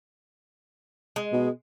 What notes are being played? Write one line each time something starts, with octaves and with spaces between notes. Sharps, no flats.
G#3
B2